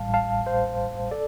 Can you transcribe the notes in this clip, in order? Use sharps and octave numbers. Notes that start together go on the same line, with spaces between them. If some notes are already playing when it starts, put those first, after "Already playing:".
Already playing: A1 A2 G3 F5 A5
F5 A5
C5 F5
A4 D5